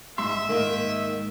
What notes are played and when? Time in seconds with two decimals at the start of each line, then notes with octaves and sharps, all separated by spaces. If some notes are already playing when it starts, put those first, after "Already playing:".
0.18 G#2 E5 C6
0.49 D#3 A#3